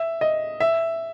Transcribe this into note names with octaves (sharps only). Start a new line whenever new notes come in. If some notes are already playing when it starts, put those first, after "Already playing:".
Already playing: E5
D#5
E5